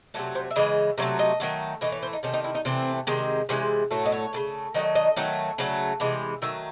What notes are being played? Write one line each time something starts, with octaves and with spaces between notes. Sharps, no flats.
C3 F#3 A3 A4
C5
E5
C#3 E3 G#3 D#5
C3 F#3 A3 E5
D#5
D#3 F#3 A3
A2 E3 A3 D#5
C#5
C5
D#4
C3 D#3 A3 C#4
D#4
E4
D#4
C3 E3 A3 C4
C3 D#3 G#3
C3 E3 G#3 C#4
A2 F#3 A3
D#5
C#5
C#3 E3 A3
D#3 F#3 A3 D#5
D#5
D#3 F#3 A3
C#3 F#3 A3
C3 E3 G#3
D#3 F#3 A3 E5